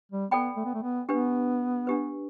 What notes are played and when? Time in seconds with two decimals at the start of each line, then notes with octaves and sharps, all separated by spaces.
0.12 G3
0.31 B3 A4 D5 G5 B5
0.57 A3
0.65 B3
0.74 A3
0.83 B3
1.09 B3 D4 G4 B4
1.87 D4 G4 B4